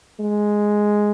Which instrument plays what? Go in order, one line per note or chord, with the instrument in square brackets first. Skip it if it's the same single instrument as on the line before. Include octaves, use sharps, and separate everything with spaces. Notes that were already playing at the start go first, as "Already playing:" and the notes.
[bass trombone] G#3